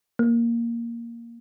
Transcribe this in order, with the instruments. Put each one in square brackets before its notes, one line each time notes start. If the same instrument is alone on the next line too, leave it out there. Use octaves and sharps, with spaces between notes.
[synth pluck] A#3